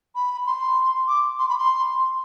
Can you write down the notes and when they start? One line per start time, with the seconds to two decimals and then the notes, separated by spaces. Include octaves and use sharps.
0.15 B5
0.46 C6
1.08 D6
1.39 C6
1.49 B5
1.58 C6